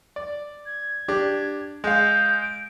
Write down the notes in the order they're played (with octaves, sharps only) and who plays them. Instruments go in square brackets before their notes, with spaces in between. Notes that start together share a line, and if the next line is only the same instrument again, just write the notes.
[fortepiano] D5
[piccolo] G#6
[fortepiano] D4 G4
[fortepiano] G#3 F5 [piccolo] G6
[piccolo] D7